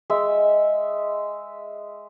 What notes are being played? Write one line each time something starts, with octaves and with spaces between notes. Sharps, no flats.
G#3 E5